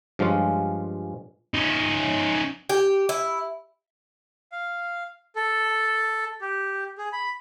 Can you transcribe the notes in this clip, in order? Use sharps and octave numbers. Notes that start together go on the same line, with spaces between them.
G2 F3 G#3 C#4 F4
C#4 D#4
G4
E4
F5
A4
G4
G#4
B5